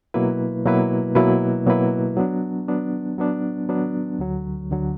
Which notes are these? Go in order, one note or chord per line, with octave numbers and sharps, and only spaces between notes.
B2 F#3 A#3 E4 B4
B2 F#3 A#3 E4 B4
B2 F#3 A#3 E4 B4
B2 F#3 A#3 E4 B4
F#3 B3 D4
F#3 B3 D4
F#3 B3 D4
F#3 B3 D4
D2 D3 F#3
D2 D3 F#3